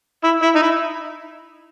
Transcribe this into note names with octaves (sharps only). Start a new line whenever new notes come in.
E4
E4
D#4
E4